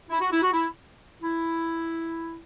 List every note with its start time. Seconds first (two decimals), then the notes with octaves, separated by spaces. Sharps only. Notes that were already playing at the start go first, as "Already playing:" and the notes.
0.10 E4
0.20 F#4
0.32 E4
0.42 F#4
0.53 E4
1.22 E4